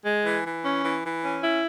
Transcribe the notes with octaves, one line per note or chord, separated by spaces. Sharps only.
G#3
E3
E3
C#4
E3
E3
C#4
E4